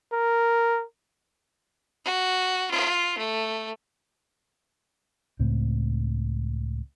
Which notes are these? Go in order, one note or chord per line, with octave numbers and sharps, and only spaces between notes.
A#4
F#4
F4
A3
C#2 A2 C4